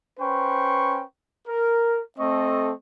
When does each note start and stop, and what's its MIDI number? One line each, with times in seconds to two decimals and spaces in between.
0.20 1.03 61
0.20 1.03 71
0.20 1.03 72
0.20 1.03 79
0.20 1.03 85
1.48 2.00 70
2.19 2.72 57
2.19 2.72 60
2.19 2.72 69
2.19 2.72 75
2.19 2.72 85